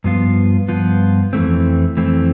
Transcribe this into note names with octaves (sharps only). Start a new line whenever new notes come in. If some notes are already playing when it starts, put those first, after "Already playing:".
G2 F3 B3 F4
G2 F3 B3 F4
F2 E3 A3 C4
F2 E3 A3 C4